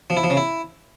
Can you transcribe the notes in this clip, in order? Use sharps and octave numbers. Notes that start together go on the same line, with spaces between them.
F3
E4
F3
C#3
E4